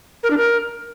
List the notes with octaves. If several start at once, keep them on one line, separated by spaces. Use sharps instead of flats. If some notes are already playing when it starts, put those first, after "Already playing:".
A#4
D4
A#4